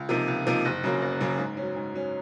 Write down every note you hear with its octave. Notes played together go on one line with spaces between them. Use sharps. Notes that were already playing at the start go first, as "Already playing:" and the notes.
Already playing: C#2
C3 F3 A#3 D#4
C#2
C3 F3 A#3 D#4
F#1
F#2 C#3 F#3 A#3
F#1
F#2 C#3 F#3 A#3
G#2
F#3 C#4
G#2
F#3 C#4